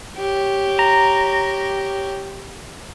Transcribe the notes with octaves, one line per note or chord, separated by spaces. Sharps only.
G4 C#5
A#5